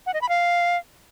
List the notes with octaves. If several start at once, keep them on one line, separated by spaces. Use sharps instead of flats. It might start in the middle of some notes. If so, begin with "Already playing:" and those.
F#5
D#5
B5
F5